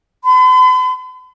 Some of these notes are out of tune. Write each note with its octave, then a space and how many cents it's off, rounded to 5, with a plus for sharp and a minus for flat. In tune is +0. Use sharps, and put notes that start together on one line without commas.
B5 +45